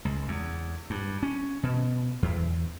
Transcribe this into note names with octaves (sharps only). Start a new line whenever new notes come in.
C#2
E2
G2
C#4
B2
E2